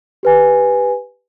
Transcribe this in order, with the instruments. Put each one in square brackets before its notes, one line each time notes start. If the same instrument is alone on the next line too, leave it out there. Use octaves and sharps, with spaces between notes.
[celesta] G4 B4 G#5